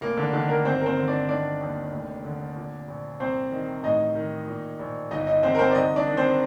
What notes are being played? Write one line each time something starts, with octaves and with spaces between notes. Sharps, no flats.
F1 A#3
D3 D4
D3 D#3 D4
A#3 A#4
G1 C4 C5
A#4
C4 C5
D3
D4 D5
D#3 D4 D5
D#2
F1
D3
A#2
A#1
C2 C4 C5
D#3
A1 D#4 D#5
D#3
A#2
A#1
G1 D#4 D#5
D#4 D#5
D3 C4 C5
A#4
C4 C5
D5
C2 D#4 D#5
D4 D5
D#3
C4 C5